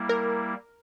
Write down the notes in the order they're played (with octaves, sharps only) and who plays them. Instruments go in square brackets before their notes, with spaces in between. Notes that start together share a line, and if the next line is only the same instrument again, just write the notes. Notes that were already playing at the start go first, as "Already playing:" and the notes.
Already playing: [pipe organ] G3 A#3 E4
[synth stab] A#4